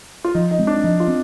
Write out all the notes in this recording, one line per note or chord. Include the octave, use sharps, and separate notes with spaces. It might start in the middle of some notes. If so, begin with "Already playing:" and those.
F4
F3 D#4
D#4
G#3 C4
D4
F3 D#4
F4
C4